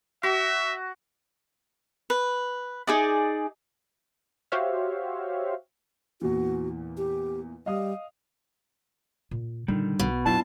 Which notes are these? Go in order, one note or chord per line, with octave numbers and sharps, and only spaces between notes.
F#4 E5
B4
D#4 G#4 D5 D#5
F#4 G4 C5 C#5 E5 F5
E2 A#2 E3 F#4
G4
G3 D#5 F5 D#6
A#2
A#2 D3 D#3 G3 D#4
B1 B2
F2 F#3 D4 E4 F4 A5